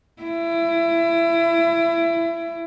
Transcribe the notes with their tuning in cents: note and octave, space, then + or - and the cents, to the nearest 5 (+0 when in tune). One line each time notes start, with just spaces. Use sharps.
E4 +25